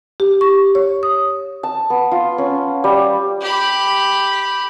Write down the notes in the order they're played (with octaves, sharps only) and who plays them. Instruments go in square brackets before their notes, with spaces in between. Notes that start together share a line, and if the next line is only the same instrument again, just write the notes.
[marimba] G4
C#6
C#5
D#6
[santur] A5
B3
F4
C#4
G3
[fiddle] G4 B5